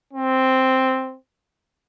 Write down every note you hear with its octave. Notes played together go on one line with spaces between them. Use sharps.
C4